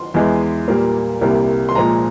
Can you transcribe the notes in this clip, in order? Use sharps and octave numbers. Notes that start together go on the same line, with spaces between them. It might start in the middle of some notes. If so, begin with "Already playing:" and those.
Already playing: C6
E2 E3 G#3
A#2 G3 A#3
C2 C3 G3 A#3
C6
A#2 F3 G#3 A#5